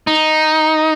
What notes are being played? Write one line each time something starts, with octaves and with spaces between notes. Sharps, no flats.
D#4